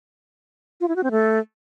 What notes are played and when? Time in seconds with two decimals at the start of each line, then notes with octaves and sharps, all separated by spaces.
0.81 F4
0.88 E4
0.96 F#4
1.04 C4
1.11 A3